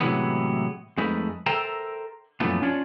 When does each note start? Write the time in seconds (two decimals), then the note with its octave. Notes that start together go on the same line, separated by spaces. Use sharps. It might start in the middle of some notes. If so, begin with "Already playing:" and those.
0.01 A2 C3 E3 F#3 G#3 B3
0.98 F2 G#3 A3 D#4 B4
1.46 A4 A#4 C5 E5 G5 A#5
2.40 F#2 A#2 E3 F3 A3 B3
2.62 C#4 D4 F4 C#5 D5